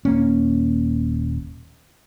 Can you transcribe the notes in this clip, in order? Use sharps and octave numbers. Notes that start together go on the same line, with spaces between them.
D#1 A#3 C#4